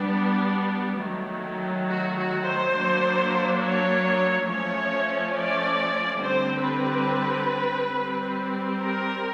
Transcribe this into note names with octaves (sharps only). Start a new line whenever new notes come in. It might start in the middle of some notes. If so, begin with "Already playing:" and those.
Already playing: G3 B3 D4
D#3 F#3 A3
F#4
F#4
C5
F#3 A#3 D4
C#5
F3 A3 C#4 C#5
D5
D3 G3 C4 C5
B4
G3 C4
A#4